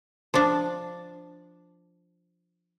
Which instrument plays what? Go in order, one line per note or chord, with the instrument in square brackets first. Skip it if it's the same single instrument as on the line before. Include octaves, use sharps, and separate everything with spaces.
[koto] F3 D4